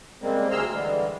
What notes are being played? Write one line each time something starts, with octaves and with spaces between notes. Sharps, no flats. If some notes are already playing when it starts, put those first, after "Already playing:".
C#3 G3 G#3 A#3 C4
D2 G#4 A#5 C6 E6 F6
D3 E3 G3 G#3